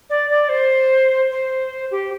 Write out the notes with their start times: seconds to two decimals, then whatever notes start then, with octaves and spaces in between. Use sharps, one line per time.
0.09 D5
0.29 D5
0.48 C5
1.30 C5
1.91 G4